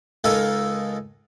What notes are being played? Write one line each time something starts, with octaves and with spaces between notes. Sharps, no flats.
C#2 G#3 D#4 F4 A4 A#4